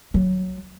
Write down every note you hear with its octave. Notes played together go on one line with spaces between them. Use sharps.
F#3